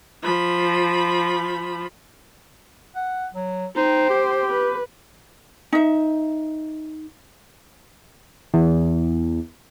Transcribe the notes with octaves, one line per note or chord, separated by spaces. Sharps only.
F3 B5
F#5
F#3
D#4 C5 G5
G4
B4
D#4 E5
E2